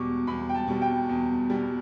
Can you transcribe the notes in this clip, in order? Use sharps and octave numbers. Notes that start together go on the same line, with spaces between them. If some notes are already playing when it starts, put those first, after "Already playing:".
Already playing: E2 B2 G3 C#6 D6
E2 B5
G5
A5
B2 G3
G5
E2
B2 G3